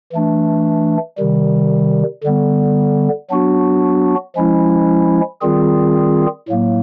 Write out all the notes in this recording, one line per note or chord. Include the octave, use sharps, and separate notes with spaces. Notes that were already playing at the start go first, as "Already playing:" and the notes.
E3 A3 D4
C3 D#3 G3
D3 G3 B3
F#3 B3 D4 F#4
F3 G#3 C#4 E4
D#3 G3 C4 F4 G#4
A2 F#3 A#3